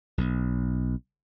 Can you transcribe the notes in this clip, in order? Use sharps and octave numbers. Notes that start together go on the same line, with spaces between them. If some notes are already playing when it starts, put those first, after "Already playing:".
B1